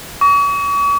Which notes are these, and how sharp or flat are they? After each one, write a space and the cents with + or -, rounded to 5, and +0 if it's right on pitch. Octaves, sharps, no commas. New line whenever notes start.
C#6 +40